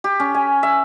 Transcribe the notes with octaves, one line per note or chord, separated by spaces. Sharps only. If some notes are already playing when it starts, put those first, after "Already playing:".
G4
C#4
G#5
E5